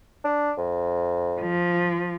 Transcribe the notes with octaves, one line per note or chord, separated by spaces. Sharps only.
D4
F2
F3